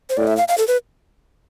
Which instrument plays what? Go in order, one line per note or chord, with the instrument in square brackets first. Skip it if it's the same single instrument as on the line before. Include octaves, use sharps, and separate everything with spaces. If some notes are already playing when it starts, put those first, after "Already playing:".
[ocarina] C5
[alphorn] A2 [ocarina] D5
[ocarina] E5
F5
F5
A4
B4